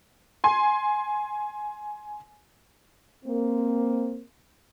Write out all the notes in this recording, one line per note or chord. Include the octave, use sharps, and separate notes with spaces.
G#5 C6
A#3 C4